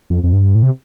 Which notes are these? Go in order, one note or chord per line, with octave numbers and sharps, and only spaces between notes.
F2
F2
G2
A2
C3